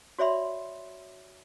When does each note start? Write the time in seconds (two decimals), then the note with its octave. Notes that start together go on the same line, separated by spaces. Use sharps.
0.19 F#4 C#5 D5 E5 B5 C6